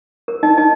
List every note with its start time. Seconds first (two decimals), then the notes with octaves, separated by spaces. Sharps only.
0.28 A#4
0.43 D#4 D#5
0.57 D#4 D#5